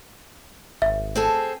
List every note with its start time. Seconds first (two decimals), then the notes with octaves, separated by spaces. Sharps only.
0.82 G#1 E5
1.15 C4 G#4 A4